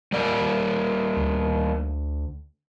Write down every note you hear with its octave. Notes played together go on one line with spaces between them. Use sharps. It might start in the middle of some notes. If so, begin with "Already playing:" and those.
G3 A#3 D5
D2